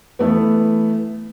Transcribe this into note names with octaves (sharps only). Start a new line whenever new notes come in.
E3 A3 B3